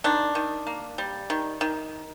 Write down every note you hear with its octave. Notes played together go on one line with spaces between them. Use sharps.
D#3 D4
D#3
A#3
G3
D#3
D#3